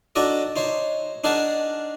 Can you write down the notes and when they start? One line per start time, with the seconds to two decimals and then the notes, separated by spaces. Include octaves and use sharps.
0.16 D4 D#4 F#4 A4 D5 D#5
0.56 D#4 C5 C#5
1.24 D4 D#4 G#4 A#4 F#5 A5